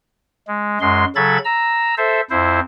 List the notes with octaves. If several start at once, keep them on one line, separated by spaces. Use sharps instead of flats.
G#3
F#2 G#3 C6
C#3 F#3 A4 B5 G#6 A6
A#5 E6
A4 C5 E5
F2 E4 C5